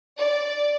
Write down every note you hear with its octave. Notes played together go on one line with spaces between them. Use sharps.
D5